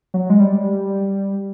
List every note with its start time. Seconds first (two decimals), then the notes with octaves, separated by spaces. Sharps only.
0.14 F#3
0.30 G#3
0.40 G3